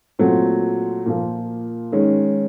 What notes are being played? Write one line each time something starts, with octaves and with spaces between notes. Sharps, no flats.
A#2 F#3 A3 C4
A#2 F3 A#3
D#3 G#3 C#4